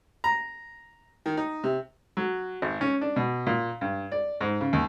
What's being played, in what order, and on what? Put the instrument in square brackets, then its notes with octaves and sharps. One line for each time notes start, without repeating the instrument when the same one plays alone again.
[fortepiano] A#5
D#3
D#4
C3
F#3
G#1
C#4
D4
B2
A#2
G2
D5
G#2
C#3
D#2